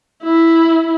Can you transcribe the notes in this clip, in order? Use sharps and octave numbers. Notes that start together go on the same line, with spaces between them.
E4